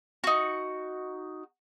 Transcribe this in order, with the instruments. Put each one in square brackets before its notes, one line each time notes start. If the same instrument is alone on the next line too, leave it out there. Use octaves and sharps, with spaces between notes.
[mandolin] D#4 F#4